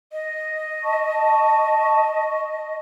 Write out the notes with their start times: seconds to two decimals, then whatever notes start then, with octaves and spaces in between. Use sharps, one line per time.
0.13 D#5
0.83 A5 C#6